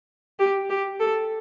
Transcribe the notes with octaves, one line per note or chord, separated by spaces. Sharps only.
G4
G4
A4